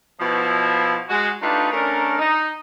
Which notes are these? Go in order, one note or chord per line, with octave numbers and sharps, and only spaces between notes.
B2 F3 E4
G#3 F#4
A3 D4 D#4 F4 G4 B4
A3 C#4 D4 A#4
D#4